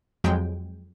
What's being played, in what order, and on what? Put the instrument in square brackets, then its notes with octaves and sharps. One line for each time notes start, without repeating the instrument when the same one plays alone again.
[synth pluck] F2 F#3 G#3 G5